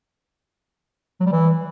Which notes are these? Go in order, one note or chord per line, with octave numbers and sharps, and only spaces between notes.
F#3
G3
E3